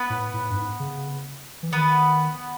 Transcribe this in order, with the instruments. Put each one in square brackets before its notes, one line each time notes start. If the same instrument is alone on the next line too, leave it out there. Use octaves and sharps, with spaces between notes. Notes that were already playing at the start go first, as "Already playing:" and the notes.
Already playing: [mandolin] B3 B4
[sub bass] A2
A2
G2
G#2
C#3
E3
[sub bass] D#3 [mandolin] B3 B4